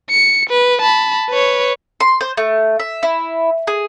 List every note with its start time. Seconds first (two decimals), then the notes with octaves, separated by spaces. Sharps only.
0.11 C#7
0.50 B4
0.82 A5 B5
1.30 B4 C#5
2.00 C6
2.21 C5
2.37 A3
2.79 E5
3.03 E4
3.67 G#4